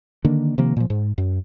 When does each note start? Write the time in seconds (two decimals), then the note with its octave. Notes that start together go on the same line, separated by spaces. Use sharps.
0.25 D3 D#3 A#3 D4
0.58 C3 D#3 F3 A#3
0.77 A#2 F3
0.90 G#2
1.18 F#2